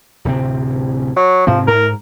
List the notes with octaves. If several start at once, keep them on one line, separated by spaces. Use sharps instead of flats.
D1 C3 C4
F#3
G#2 C3 F3 C4
G#2 A#4